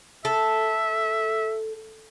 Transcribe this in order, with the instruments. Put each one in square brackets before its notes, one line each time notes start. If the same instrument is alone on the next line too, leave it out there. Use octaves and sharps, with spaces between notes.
[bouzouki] A4 [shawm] E5